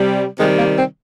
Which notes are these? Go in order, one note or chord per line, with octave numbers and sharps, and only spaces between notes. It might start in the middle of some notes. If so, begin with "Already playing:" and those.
Already playing: C3 G3
C3 D#3 G3 G#3
A#3
C4